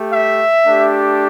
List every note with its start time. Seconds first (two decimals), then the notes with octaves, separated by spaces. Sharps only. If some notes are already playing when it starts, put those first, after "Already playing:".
Already playing: A3 G4
0.10 E5
0.65 A3 D4 G4